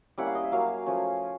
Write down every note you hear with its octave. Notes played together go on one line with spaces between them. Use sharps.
G3 A#3 C#4 E4 F#5
F5
D#5
E5
F#3 A#3 C#4 F5
F3 A3 C#4